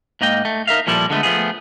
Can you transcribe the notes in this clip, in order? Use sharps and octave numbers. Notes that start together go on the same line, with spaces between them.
G#2 A#3 D#5 G5
A3
D#4 A#4 E5 F5
A#2 F3 G3 E4 A4
D3 G#3 A3 B3
F3 A3 B3 G#4